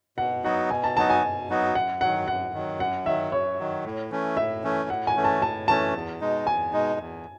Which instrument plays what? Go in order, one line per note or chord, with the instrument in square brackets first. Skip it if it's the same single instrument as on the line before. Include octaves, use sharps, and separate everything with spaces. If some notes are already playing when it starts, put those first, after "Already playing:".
[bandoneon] B2 [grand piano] F#5
[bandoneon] F#3 B3 D#4 F#4 [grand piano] F#5
[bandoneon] B2 [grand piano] G#5
[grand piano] A5
[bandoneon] F#3 B3 D#4 F#4 [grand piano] A5
[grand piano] G#5
[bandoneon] B2
F#3 B3 D#4 F#4
[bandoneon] F#2 [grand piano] F#5
[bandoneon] D#3 F#3 [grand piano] F#5
[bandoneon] F#2 [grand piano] F#5
[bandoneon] D#3 F#3
[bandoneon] F#2 [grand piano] F#5
[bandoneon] D#3 F#3 [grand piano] E5
[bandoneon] F#2 [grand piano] C#5
[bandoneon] D#3 F#3
A2
E3 A3 C#4
[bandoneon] A2 [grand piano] E5
[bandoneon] E3 A3 C#4
[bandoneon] A2 [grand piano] F#5
[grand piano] G#5
[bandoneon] E3 A3 C#4
[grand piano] A5
[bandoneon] A2 [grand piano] A5
[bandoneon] E3 A3 C#4 [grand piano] A5
[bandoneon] E2
B2 G#3 D#4
[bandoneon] E2 [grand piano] G#5
[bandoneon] B2 G#3 D#4
E2